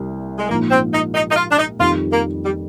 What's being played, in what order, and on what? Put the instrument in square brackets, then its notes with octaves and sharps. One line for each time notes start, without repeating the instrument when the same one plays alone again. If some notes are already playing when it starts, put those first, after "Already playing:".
Already playing: [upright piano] C2 C3 G3
[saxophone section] G#3
[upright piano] A#1 G#2 F3 [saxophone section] A#3
[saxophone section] C4
D#4
D#4
D#4
F4
D4
D#4
[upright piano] F2 D#3 G3 [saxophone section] F4
[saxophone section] A#3
G3